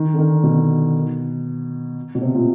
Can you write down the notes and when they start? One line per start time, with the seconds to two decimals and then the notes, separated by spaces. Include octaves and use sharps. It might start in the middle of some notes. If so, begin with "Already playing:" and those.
Already playing: D#3
0.14 D3
0.19 D#3
0.43 B2
2.15 B2
2.22 C3
2.35 A#2